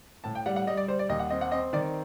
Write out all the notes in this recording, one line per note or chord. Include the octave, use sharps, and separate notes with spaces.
A2 A5
G5
G3 F#5
F#5
G3 D#5
D5
G3 C5
D5
D#2 D#5
F#5
C4 D#5
F#5
C4 D#5
D#3 D5